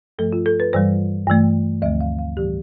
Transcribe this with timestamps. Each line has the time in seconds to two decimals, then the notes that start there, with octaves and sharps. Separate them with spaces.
0.19 G2 F3 A3 A4
0.33 F4
0.46 A4
0.60 B4
0.73 G2 E3 G3 C5
1.28 G2 E3 A3
1.82 D2 D3 F3 A3 E5
2.01 F5
2.19 F5
2.37 A2 E3 G3 G4